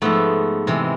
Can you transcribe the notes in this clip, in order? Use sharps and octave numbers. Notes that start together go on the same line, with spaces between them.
G#2 F3 A3 B3
C3 E3 G#3